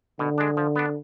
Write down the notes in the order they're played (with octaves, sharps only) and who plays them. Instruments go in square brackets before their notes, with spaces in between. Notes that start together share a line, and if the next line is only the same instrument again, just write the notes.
[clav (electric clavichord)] B2 [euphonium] D3
[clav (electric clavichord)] G#3 D4
F3
B3 D4